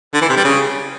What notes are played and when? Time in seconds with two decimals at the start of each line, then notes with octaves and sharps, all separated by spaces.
0.14 D3
0.22 E3
0.29 C3
0.37 G3
0.45 C#3